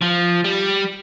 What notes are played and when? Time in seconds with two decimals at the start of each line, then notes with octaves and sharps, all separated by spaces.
0.02 F3
0.45 G3